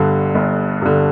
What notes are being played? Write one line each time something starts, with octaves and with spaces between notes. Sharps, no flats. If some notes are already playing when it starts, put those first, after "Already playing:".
Already playing: G1 G2 D3
G1
G2 D3